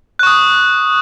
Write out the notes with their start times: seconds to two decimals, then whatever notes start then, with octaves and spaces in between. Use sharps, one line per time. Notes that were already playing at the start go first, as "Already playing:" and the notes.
0.19 F#6
0.23 C#6
0.27 D#6